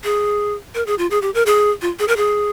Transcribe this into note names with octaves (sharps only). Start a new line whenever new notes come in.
G#4
A#4
G#4
F4
G#4
G4
A#4
G#4
F4
G#4
A#4
G#4